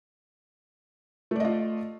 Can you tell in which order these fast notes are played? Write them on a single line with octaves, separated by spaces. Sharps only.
A3 D5 D#5 F4